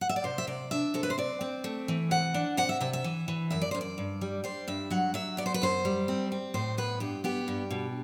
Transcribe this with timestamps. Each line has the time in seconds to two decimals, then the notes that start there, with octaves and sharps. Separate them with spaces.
0.01 F#5
0.09 E5
0.16 D5
0.24 C3 C5
0.38 E5
0.47 C3 D5
0.71 D4 E5
0.94 C3 A4
1.03 B4
1.10 C5
1.18 C4 D5
1.41 C4
1.64 A3
1.88 E3
2.11 C3 F#5
2.34 D4
2.57 C3 F#5
2.69 E5
2.81 C3 E5
2.93 E5
3.04 E3
3.28 E3
3.50 F#2 E5
3.62 D5
3.71 F#2 C5
3.81 D5
3.98 G2
4.21 G3
4.44 G3 C5
4.68 G2 E5
4.90 F#3 F#5
5.14 F#3 E5
5.37 B3 D5
5.46 C5
5.54 B4
5.62 F#2 C5
5.85 G3
6.08 C4
6.32 C4
6.54 A2 C5
6.78 B3 B4
7.00 G2 G4
7.24 B3 G4
7.48 G2
7.71 B2